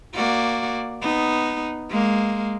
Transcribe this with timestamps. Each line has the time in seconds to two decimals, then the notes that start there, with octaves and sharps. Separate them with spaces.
0.14 A#3 F#4 D5
1.01 B3 D#4
1.90 G#3 A#3